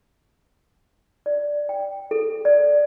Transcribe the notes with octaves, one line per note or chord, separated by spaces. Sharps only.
D5
G5
A4
D5